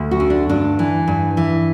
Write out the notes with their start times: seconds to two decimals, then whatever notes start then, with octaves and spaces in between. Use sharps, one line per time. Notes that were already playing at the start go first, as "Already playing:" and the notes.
Already playing: D2
0.11 F#4
0.20 D3
0.30 D4
0.49 G2 D4
0.79 E3
1.08 G2
1.37 E3